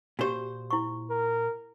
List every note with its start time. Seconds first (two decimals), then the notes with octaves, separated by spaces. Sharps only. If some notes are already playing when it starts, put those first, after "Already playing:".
0.19 A#2 F#4 G4 C5
0.71 E4 C#6
1.10 A#4